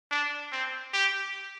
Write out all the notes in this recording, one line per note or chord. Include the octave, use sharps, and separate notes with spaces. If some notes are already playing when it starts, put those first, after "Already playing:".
D4
C4
G4